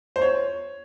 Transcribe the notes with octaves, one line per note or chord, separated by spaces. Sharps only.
C5
C#5